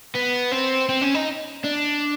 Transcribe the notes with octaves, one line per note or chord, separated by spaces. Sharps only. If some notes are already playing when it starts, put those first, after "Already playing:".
B3
C4
C4
C#4
D#4
D4